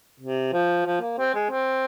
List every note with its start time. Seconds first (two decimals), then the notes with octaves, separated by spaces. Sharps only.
0.20 C3
0.53 F3
0.86 F3
1.01 A#3
1.18 C4
1.35 G#3
1.51 C4